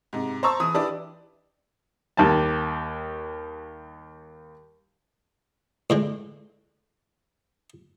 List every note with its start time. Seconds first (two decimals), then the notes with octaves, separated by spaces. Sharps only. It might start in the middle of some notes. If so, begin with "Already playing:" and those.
0.13 G#2 C3
0.43 C5 A5 A#5 C#6 E6
0.60 E3 D#6
0.74 D4 E4 G4 B4 D5
2.17 D#2 G3 A5
5.90 A2 D3 G#3